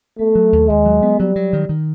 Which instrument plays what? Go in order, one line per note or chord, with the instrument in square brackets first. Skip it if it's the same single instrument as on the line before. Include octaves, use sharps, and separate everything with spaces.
[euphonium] A3 [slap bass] B3
[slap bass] F#3
D#2
[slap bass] D#2 [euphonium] G#3
[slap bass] F#3
B3
[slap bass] F#3 [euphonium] G3
[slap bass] F#3
D#3
D#3